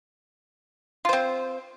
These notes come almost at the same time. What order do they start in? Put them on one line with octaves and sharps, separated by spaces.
F4 C5 C4